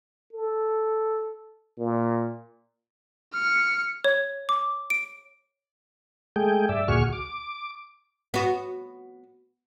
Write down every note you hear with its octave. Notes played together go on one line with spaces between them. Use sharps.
A4
A#2
F6 C#7
C#5
D6
D7
G#3 A3 G#4 G5
G2 D5 E5
D2 A#2 F#4 G#4 C#6 F6
D6
B3 F#4